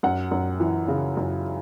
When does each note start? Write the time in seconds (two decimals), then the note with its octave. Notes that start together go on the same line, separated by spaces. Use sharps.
0.03 F#2 F#5
0.31 F#2
0.60 E3
0.88 C#3
1.17 F#2